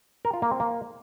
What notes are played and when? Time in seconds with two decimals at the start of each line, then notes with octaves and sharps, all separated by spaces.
0.25 A#4
0.33 F4
0.42 A#3
0.51 C4
0.60 A#3